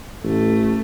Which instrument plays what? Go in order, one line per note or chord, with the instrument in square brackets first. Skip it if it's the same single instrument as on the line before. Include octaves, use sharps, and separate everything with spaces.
[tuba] A1 [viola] A3